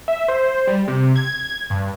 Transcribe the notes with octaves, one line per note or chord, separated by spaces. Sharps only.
E5
C5
G3
C3
G#6
G2